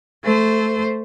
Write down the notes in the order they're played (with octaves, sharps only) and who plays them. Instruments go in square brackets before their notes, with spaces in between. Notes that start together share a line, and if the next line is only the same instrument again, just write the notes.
[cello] A3 C5